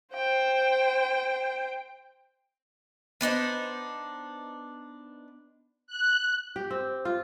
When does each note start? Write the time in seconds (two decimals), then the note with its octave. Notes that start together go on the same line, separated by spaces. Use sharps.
0.14 C5 G5
3.21 B3 D4 D#4 C5
5.87 F#6
6.56 G4
6.71 C4
7.05 F4